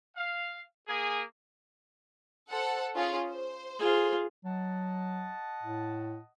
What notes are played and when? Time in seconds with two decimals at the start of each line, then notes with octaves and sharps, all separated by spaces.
0.17 F5
0.88 A#3 G#4
2.51 A4 C5 F#5
2.96 C#4 F4 G#4
3.29 C5
3.79 F4 G#4
4.45 F#3 D#5 F#5 A5
5.63 A2